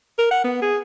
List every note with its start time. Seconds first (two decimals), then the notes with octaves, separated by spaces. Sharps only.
0.19 A#4
0.31 F#5
0.44 B3
0.62 G#4